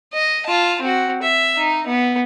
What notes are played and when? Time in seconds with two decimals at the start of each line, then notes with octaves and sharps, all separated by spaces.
0.13 D#5
0.46 F4 A5
0.82 C4 F#4
1.23 E5
1.58 D#4
1.87 B3